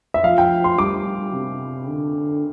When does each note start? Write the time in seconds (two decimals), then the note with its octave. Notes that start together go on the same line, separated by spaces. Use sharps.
0.14 E5
0.23 F3 F5
0.38 G5
0.64 C6
0.78 G3 D6
1.34 C3
1.89 D3